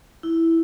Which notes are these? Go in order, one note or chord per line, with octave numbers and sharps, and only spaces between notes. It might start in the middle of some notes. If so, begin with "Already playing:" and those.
E4